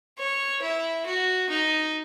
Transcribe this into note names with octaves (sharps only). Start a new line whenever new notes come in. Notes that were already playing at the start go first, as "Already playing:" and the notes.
C#5
E4
F#4
D#4